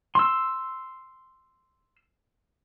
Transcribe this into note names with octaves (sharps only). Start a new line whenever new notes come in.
C6 E6